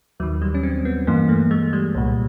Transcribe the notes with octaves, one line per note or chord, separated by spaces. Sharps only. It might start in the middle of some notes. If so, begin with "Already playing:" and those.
D#2 D#3 F#3
G3
C#4
C4
B3
G2 E3 A#3
A3
G#3
G3
C2 A#2